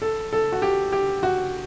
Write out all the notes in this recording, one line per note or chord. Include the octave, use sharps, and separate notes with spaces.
A4
A4
F#4
G4
G4
F#4